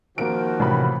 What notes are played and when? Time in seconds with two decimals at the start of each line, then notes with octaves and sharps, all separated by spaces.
0.18 D#3 F3 A#3 F#4 D7
0.60 A1 C3 B5